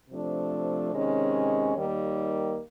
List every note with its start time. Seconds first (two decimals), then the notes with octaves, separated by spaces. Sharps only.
0.10 C3 F3 A3 D4
0.92 C3 D#3 G#3 C#4
1.75 D#2 D#3 G3 A#3